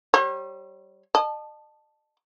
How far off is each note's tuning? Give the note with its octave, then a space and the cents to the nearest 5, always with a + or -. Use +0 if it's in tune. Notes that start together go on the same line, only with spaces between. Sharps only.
G3 -20 C#5 -40
D#5 -40 A5 +0